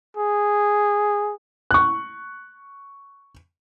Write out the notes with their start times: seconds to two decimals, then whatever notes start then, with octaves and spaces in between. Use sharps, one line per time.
0.17 G#4
1.71 C#6 F#6